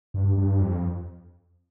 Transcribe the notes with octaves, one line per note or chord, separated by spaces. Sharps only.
G2
G2
F2